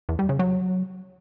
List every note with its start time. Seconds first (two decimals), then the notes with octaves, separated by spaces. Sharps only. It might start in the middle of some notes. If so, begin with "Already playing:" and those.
0.09 E2
0.19 G3
0.29 C#3
0.39 F#3